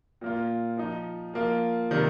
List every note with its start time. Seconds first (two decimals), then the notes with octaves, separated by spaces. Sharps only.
0.21 A#2 A#3 F4
0.77 F3 D#4
1.34 F3 A#3 F4
1.91 C3 D#3 G3 A#3